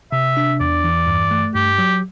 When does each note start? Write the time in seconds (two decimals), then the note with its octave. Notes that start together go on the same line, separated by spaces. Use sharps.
0.12 C3 E5
0.37 D4
0.60 E2 D5
0.84 E3
1.07 G2
1.31 A3
1.55 G2 G4
1.79 F#3